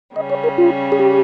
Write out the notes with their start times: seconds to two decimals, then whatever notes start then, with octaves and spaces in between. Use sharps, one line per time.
0.16 C#3 G3 C#4 D#5
0.30 C#5
0.44 A#4
0.58 F4
0.92 G#4
0.99 G4